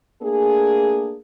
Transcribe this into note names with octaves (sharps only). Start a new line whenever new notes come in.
A3 A#3 D4 G#4